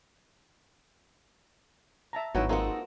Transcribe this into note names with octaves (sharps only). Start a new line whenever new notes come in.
E5 A5 A#5
G#1 F#3 D#4 E4 F#4 B4 F#5
G#3 A#3 C4 D#4 F4 A4 F#5